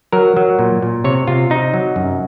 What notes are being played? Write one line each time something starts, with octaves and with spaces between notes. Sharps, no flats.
F#3 A#4
F#3
A#2
A#2
C3 C#5
C3 F4
C3 D#4
F#3
F#2